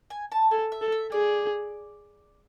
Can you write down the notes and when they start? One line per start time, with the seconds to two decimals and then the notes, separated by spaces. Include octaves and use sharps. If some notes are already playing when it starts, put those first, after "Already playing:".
0.10 G#5
0.32 A5
0.51 A4 G#5
0.72 E5
0.82 A4
0.92 E5
1.12 G#4 D5